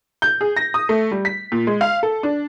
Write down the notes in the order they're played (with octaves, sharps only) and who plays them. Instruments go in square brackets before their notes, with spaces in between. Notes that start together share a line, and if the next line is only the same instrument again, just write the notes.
[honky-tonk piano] G6
G#4
A#6
D#6
A3
G3
B6
A#2
G#3
F5
A4
D4